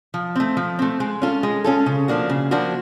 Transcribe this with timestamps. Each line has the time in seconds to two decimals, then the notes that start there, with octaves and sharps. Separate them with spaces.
0.14 F3
0.36 A3 C4
0.57 F3
0.79 A3 C4
1.00 G#3
1.22 C#4 F4 A4
1.43 G#3
1.64 C#4 F4 A4
1.86 C#3
2.08 F3 A#3 D4 F#4
2.29 C#3
2.51 F3 A#3 D4 F#4